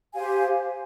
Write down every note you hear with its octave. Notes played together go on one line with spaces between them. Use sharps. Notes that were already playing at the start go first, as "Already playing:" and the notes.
G4 C5 F5 G#5